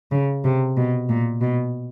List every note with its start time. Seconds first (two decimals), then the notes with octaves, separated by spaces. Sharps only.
0.11 C#3
0.44 C3
0.77 B2
1.09 A#2
1.41 B2